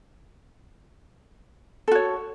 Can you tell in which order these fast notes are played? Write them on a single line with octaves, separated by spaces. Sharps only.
A4 F#4 C#5